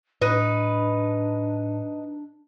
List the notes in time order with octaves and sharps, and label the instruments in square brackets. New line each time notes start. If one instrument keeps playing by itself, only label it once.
[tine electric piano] A2 [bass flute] D4 [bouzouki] D#4 B4